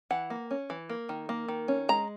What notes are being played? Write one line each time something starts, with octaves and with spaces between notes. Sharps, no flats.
E3 F#5
A#3
C#4
E3
A#3
D#3
A#3
D#3
C#4
G#3 A#5